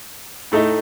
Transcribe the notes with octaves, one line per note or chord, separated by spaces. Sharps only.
A2 A3 D#4